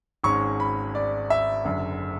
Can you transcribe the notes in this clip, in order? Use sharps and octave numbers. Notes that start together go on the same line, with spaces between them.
G#1 G#2 G#3 C#4 C#6
B5
D5
E5
F#1 F#2 D3